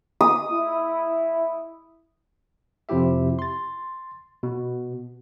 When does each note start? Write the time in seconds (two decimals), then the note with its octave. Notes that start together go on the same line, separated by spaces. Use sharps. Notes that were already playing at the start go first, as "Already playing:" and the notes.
0.21 D#6
0.51 E4
2.89 F2 C3 F3 E4 G4 E5
3.39 C6 A6
4.43 B2